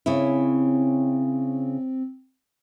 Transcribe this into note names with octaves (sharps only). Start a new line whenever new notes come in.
C#3 C4 C#4 E4